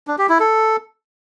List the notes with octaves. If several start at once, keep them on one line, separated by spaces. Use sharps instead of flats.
D4
G4
E4
A4